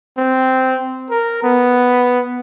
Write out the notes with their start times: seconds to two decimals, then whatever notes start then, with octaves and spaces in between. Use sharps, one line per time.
0.18 C4
1.11 A#4
1.43 B3